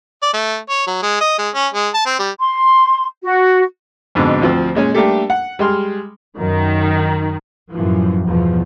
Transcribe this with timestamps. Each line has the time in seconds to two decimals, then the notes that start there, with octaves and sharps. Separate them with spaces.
0.23 D5
0.34 A3
0.70 C#5
0.87 F#3
1.03 G#3
1.21 D#5
1.39 G#3
1.55 C#4
1.74 G#3
1.94 A5
2.06 C4
2.19 G3
2.39 C6
3.23 F#4
4.15 F2 G#2 B2 D3
4.42 D2 F3 C4
4.75 A#2 G#3 C#4
4.94 G3 A3 A#3 D4 G4 A4
5.30 F#5
5.59 G3 G#3 C6 F6
6.38 F#2 D#3
7.71 F#2 A2 E3 F3
8.27 E2 G2 B2 F3